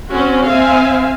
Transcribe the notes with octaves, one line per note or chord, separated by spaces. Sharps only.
C4 C#4 F#4
C4 E5 F5 G#5